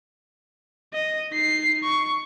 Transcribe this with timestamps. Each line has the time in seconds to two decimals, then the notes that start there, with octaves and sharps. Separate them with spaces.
0.93 D#5
1.32 D#4 C7
1.83 C#6